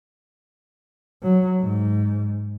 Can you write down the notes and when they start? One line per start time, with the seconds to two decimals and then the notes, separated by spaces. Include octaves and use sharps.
1.23 F#3
1.62 G#2